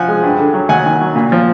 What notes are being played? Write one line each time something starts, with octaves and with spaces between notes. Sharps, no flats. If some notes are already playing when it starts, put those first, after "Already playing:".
Already playing: F3 F#5 G#5
G#3
G2
D3
F#3
D#2 F#5 G#5
D#3
F#3
A#2
F3